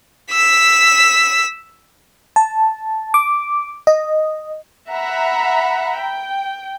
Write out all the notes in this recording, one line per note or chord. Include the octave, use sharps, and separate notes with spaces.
E6 B6
A5
D6
D#5
E5 F#5 A#5 B5
G5